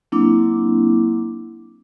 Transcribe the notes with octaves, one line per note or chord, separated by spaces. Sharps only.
F#3 A#3 C4 D4 E4 D6